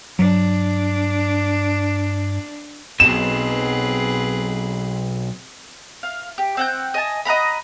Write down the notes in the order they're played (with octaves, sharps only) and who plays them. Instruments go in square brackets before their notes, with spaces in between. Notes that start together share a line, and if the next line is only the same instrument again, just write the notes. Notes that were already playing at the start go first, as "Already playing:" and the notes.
[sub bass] G2 [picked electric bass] F#3 [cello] D4
[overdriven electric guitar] B1 B2 [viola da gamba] C4 G#4 B4 [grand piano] E7
[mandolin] F5
G4
C4 F#5 G6
D#5 G#5 A5
D#5 F#5 A#5 B5